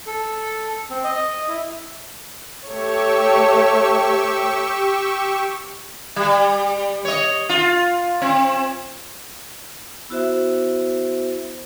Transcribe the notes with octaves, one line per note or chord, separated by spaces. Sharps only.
A4
C4
D#5
E4
A3 G4 C#5 C#6 E6
G3
C#5 D#5
F4
C4
B3 E4 F#4 C5 E5